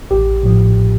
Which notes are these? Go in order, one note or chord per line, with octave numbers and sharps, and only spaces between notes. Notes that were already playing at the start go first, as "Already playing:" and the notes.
A1 G4
A2 F3